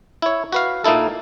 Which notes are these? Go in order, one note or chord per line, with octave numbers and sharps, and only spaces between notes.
E4 C#5
F#4 B4 F5
A#2 A#3 D#4 E4 A4